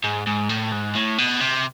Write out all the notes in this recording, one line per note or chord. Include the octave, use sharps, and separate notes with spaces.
G#2
G#2
A2
G#2
A2
B2
C3